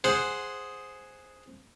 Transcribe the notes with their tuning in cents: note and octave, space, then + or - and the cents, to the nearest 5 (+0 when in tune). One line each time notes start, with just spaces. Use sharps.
G#4 +0 C5 +0 F#5 +0